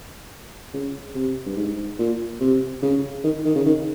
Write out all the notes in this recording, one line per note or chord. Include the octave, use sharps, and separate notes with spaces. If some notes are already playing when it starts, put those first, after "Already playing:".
C#3
C3
G2
G#2
A#2
C3
C#3
D#3
D#3
C#3
D#3